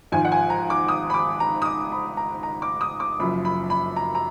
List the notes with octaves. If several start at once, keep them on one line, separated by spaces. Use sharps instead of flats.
G#1 G#2 F3 G#5
F#5
G#5
A#5
D6
D#6
B5
D6
A#5
D#6
D6
B5
A#5
A#5
D6
D#6
D6
F#1 F#2 F3 B5
B5
B5
A#5
A#5